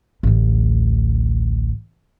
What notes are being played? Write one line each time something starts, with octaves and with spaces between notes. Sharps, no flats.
A1 D2